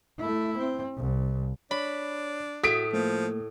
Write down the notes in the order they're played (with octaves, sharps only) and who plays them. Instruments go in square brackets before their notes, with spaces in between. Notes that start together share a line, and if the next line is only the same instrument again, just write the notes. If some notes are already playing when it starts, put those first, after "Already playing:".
[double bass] A3 E4
C4
C2
[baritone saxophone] D4 [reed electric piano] C#5 [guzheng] B5
[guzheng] A2 [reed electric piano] F#4 [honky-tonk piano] D#6 B6 D7
[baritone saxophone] F3 [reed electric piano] A3 A#3